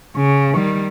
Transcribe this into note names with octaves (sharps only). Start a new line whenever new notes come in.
C#3
D#3 G3